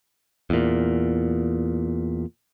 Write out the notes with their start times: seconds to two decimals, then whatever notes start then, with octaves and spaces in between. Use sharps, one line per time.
0.50 E2 A#2